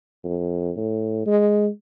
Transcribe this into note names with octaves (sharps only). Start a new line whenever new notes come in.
F2
A2
G#3